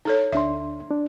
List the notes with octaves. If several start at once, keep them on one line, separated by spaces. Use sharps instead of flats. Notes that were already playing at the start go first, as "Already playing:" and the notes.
D#4 A4 C#5
D2 D4 E5 C6
D4